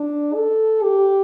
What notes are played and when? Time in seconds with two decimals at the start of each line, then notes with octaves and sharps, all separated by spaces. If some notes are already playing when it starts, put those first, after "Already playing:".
Already playing: D4
0.35 A4
0.84 G4